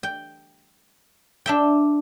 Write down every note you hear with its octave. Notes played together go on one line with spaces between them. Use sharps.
G5
D4 E5 G5